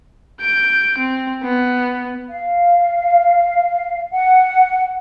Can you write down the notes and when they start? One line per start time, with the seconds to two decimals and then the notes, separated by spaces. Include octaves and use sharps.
0.41 G6 D7
0.98 C4
1.43 B3
2.29 F5
4.11 F#5